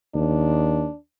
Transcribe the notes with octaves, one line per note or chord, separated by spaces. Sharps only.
D#2 D4